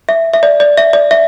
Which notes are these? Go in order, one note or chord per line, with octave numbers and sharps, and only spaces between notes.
E5
E5
D5
D5
E5
D5
E5